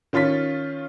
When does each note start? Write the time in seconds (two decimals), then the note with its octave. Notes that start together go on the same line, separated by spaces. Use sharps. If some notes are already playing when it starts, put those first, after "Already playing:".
0.13 D#3 C#4 F4 A6 B6